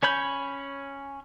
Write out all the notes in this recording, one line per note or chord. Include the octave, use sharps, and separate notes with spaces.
C#4 C#5 B5 G6